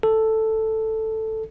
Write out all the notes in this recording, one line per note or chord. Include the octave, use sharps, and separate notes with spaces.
A4